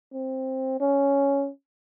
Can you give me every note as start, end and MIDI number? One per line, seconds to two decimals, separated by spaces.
0.14 0.80 60
0.80 1.49 61